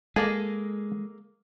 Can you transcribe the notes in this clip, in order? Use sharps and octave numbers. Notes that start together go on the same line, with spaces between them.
G#3 A#3 G#4 A4 D#5